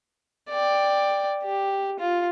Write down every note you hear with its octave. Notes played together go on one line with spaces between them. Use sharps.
D5 G5
G4
F4